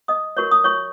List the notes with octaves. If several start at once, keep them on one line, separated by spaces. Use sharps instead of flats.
D#5 D#6
F#4 A#4 C#5 C#6
D#6
C#5 C#6